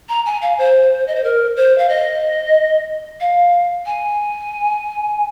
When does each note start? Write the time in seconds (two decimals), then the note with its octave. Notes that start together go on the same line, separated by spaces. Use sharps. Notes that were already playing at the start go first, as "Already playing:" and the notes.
0.09 A#5
0.26 G#5
0.42 F5
0.58 C5
1.08 D#5
1.16 C5
1.24 A#4
1.57 C5
1.78 F5
1.89 D#5
3.21 F5
3.86 G#5